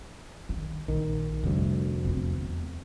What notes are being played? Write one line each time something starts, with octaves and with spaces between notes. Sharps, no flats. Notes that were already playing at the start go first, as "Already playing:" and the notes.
D#3
A#1 D#3
F1 D2 G3 A3
E2 C4